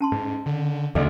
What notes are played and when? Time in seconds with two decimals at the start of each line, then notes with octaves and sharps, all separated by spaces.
0.01 C#4 A5 C6
0.12 G#2
0.46 D3
0.95 D2 C#3 A4 D5 D#5